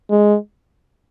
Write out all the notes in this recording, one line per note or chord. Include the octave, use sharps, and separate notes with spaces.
G#3